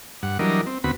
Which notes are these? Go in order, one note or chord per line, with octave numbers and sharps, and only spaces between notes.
G2 F#5
E3 F#3 G3 D4 A#4 D#5
C4
D2 B3 C4 F#4 B5